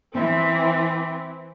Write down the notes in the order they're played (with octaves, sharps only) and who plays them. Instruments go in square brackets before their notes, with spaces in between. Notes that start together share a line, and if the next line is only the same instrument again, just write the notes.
[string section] E3 C4